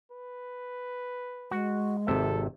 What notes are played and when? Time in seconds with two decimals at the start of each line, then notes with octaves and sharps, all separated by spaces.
0.12 B4
1.51 G#3 F#4
2.07 G#1 C3 A4 E5